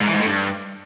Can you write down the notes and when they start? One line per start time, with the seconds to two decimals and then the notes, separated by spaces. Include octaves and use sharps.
0.01 G#2
0.07 E3
0.13 G#2
0.20 A2
0.26 G2